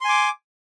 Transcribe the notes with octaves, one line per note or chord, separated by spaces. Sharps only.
G#5 C6 D6